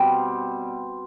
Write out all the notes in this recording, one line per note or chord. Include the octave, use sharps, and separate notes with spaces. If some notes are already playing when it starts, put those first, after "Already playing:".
Already playing: B2 G3 C4